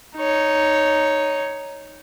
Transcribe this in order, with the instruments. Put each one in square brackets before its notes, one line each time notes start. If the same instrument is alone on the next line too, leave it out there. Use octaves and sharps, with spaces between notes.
[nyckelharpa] D#4 C#5